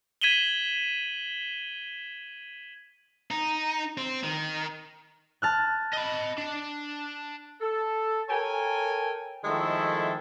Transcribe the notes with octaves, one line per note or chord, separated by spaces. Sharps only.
G#6 B6 D#7 E7 F#7 G7
D#4
C4
D#3
A5 F6 F#6
D#5 B5
D4
A4
A4 A#4 C#5 G5 G#5
D#3 F3 G#3 A3 E4 A4